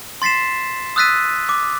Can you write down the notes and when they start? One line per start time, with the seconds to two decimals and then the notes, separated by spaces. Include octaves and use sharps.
0.22 C6 A6 B6 C7 E7
0.96 D#6 E6 F#6 A6 B6 D#7
1.49 D6